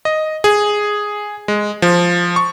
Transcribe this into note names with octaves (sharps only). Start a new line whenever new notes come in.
D#5
G#4
G#3
F3
C#6